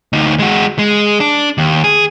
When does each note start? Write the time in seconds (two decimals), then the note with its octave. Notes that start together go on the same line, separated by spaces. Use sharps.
0.13 D2 D#4
0.39 G#3 F#4
0.79 G#3
1.20 D4
1.58 D#2
1.84 G#4